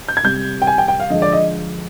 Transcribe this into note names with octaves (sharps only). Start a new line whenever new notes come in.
G6
G#6
C3 G3 G6
G5
G#5
G5
G5
F5
D3 F3 G#3 D#5
D5
D#5